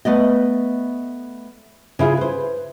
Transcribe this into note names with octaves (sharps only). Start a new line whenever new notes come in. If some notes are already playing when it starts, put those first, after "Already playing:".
A3 B3 D5 D#5
C#3 E4 F4 G#4
B4 C5